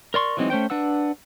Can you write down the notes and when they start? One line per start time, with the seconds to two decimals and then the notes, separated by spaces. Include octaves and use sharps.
0.14 A#4 D5 C6 C#6
0.37 E3 F#3 G#3 C4 D#4
0.50 A3 C#4 C5 G5
0.70 D4 B4 F#5 E6